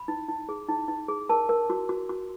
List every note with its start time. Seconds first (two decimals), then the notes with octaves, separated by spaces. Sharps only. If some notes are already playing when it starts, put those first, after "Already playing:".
Already playing: B5
0.08 D#4
0.28 D#4
0.49 G#4
0.68 D#4
0.88 D#4
1.08 G#4
1.29 A#4 A5
1.49 A#4
1.70 F#4
1.89 F#4
2.09 F#4